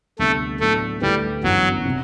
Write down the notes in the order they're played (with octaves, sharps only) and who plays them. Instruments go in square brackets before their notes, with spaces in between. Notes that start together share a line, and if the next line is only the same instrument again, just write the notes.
[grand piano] D2 C3 G3 B3 D4 [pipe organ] A3
[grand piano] A2 F#3 B3 D4 [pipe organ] A3
[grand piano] D2 D3 A3 E4 B4 [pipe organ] G3
[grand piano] G1 F#2 E3 B3 [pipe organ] F#3
[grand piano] C3